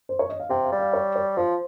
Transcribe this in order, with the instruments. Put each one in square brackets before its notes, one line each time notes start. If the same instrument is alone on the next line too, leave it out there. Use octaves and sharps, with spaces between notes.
[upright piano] C5
C#5
D#5
F5
[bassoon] C3 [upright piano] G5
[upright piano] F5
[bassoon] G3
[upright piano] F5
C#5
C#5
[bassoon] F3 [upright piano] C5